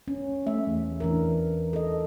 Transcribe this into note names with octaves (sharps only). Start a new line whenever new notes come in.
C#4
A3 E5
E2
E3 D4 A#4
A4 D#5